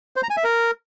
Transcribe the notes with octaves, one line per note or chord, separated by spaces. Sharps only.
C5
A#5
G#5
E5
A#4